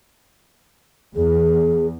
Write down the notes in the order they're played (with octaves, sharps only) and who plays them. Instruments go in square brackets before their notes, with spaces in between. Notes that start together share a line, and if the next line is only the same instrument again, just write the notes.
[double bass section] E2 [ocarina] G#4